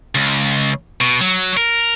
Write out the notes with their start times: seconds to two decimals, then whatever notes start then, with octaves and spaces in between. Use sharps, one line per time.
0.15 C#2
1.01 B2
1.21 F#3
1.57 A#4